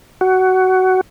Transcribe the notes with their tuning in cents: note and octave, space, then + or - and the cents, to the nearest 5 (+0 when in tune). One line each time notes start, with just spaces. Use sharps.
F#4 +15